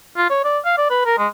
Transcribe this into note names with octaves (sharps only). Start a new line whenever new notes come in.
F4
C#5
D5
F5
D5
B4
A#4
G#3